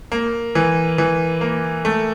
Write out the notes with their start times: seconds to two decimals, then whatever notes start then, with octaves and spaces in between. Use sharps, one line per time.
0.12 A#3
0.55 E3
0.98 E3
1.41 A#3
1.85 A3